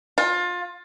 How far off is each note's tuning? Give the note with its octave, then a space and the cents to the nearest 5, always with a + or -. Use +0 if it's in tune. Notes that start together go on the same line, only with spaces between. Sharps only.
F4 +25